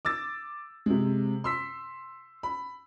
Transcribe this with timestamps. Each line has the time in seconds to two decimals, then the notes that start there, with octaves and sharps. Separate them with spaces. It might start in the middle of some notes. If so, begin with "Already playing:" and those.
0.05 D6 E6 A6
0.86 C3 G#3
1.44 C6 E6 B6
2.43 B5